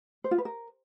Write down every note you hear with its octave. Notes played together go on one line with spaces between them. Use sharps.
C5
F4
B4
A#4